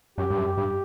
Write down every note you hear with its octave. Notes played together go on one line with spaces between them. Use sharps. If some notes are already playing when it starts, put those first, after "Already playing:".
F#2 G4
G2
F#2
G4
G2